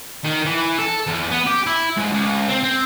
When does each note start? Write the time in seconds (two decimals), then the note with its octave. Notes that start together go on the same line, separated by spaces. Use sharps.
0.24 D#3
0.46 E3
0.78 A4
1.07 E2
1.31 B3
1.46 G4
1.66 E4
1.97 G#2
2.13 C#2
2.49 C4
2.63 C4